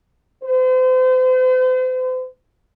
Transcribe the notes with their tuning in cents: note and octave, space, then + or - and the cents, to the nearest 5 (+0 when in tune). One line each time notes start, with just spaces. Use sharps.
C5 -40